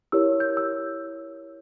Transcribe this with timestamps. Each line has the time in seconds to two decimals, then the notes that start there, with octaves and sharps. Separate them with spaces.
0.12 E4 G4 A#4 C#5 E6
0.40 G6
0.57 E6